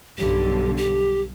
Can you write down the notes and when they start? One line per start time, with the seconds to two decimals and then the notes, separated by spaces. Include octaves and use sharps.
0.18 B1 G2 D3 G4
0.77 G4